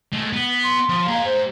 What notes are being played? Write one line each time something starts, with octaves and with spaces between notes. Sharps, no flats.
G#3 A3
B3
C6
F3
G#3 A#3 A#5
C5